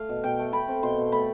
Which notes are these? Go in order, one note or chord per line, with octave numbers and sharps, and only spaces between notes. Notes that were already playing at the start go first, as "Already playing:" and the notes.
Already playing: A3 F5
B2
B2 G5
A3
A3 B5
C4
B2 C6
B2
A3 B5